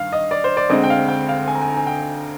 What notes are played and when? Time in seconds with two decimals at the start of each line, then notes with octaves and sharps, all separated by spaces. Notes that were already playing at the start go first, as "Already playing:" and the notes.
Already playing: G2 D#3 F5
0.13 D#5
0.31 D5
0.44 C5
0.57 D5
0.70 D2 D3 G#3 C4 D#5
0.84 G5
0.90 F5
1.09 G5
1.29 F5
1.48 G#5
1.55 A#5
1.62 G#5
1.70 A#5
1.76 G#5
1.87 G5